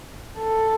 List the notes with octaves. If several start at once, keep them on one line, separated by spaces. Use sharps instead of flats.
A4